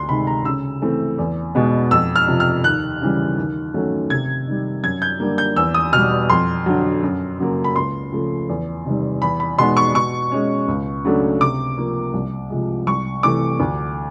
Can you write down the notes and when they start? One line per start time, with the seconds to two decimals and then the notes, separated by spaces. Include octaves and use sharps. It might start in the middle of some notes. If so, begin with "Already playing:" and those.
Already playing: D2 C6
0.09 C3 D#3 G#3 B5
0.27 A#5
0.45 C#3 E6
0.82 E3 A3 C4
1.18 E2
1.55 B2 G#3 B3
1.91 F2 E6
2.16 F6
2.28 C3 F3
2.40 F6
2.64 D#2 F#6
3.01 C#3 E3 G3
3.38 D#2
3.74 D#3 F#3 A3 C#4
4.10 C3 G#6
4.47 D#3 G3
4.83 F#2 G#6
5.02 G6
5.20 D3 G3 A#3
5.38 G6
5.56 E2 E6
5.74 D#6
5.93 B2 G3 F6
6.29 F2 C6
6.66 D3 F#3
7.03 F#2
7.39 C#3 F#3 A#3
7.64 B5
7.75 C#2 C6
8.12 C#3 F3 A3
8.49 E2
8.85 C3 D#3 G3
9.22 E2 B5
9.40 B5
9.58 B2 G#3 B3 D#4 C6
9.77 C#6
9.95 B2 C#6
10.32 G#3 C#4
10.68 C#2
11.05 C#3 F#3 A3 D4
11.41 C3 D6
11.78 F3 A#3
12.14 C2
12.50 C3 F3 G#3
12.87 C2 C#6
13.23 C3 E3 A3 D6
13.60 D2